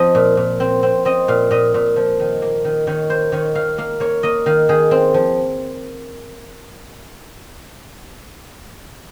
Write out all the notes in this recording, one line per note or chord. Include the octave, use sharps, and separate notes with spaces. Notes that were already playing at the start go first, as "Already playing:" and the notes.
Already playing: F3 C4 D#5
A#2
A#2
C4
C4
C4 D#5
A#2 F5
A#2 D#5
A#2
F3
D#3
A#3
D#3
D#3 C#5
A#3 C5
D#3 C#5
D#3 F5
A#3 F5
A#3 C#5
A#3 D#5
D#3 F5
D#3 G#4
C4
F3